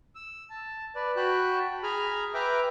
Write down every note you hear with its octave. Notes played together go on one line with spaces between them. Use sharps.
E6
A5
B4 D5
F#4 G5 A5 B5 F#6
G#4 G#5 A#5 B5 F6
B4 E5 G5 A#5 D6 F6